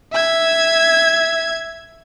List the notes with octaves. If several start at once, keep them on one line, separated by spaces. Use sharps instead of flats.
E5 G#6